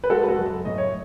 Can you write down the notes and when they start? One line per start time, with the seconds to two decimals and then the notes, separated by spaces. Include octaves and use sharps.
0.04 B4
0.10 G#3 F#4 A4
0.23 B4
0.28 F#4 A4
0.38 F#2
0.65 A2 D#5
0.78 C#5